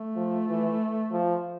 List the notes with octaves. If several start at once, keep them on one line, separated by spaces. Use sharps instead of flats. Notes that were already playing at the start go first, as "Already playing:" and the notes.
Already playing: A3
F3
E3
F3